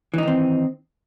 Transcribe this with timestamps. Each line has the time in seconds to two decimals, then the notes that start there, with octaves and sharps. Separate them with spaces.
0.14 E3
0.18 D#4
0.23 D#3
0.28 C4